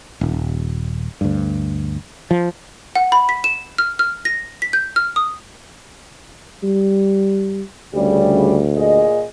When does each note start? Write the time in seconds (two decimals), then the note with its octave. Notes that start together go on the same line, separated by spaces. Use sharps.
0.21 D#1
1.21 D2 G2
2.31 F3
2.95 F#5
3.12 B5
3.29 B6
3.44 E7
3.78 F6
3.99 F6
4.25 A#6
4.62 B6
4.73 G6
4.96 F6
5.16 D#6
6.63 G3
7.94 D2 C#3 G3
8.76 A#2 G#4 D#5